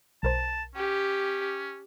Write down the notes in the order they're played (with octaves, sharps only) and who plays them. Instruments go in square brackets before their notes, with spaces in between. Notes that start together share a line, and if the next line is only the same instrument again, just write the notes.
[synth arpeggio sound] B1 A#4 C5 [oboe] A5
[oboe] C#4 [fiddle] G4